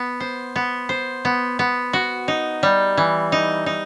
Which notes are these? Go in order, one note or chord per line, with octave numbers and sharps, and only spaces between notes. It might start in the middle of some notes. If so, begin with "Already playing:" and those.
Already playing: B3
C5
B3
C5
B3
B3
F#4
D#4
G3
E3
D#4
D#4